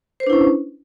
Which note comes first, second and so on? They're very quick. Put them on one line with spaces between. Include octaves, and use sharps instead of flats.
C5 B4 D4 E4 C#4